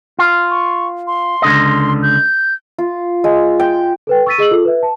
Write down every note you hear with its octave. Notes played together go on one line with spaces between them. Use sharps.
F4
C#6
C6
C#2 D3 D#5
G6
F4
G#3
G5
A4 B4 G5
C#6 E6 A6 B6 D#7
G#4 D#5 E6 F#7
F4 A4
B4 E5
A5